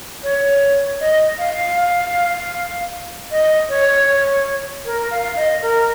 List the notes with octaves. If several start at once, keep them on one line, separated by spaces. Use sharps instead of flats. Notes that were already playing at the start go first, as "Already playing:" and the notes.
C#5
D#5
F5
D#5
C#5
A#4
F5
D#5
A#4